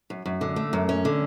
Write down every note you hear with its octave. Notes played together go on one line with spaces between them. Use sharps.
F#2
F#2
D3
A3
F#2
C#4
D3